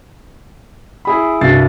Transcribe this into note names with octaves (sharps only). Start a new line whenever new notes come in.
E4 G#4 B5
C2 G2 F#4 A6 C7